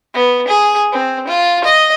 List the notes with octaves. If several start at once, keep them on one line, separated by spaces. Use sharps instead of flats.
B3
G#4
C4
F4
D#5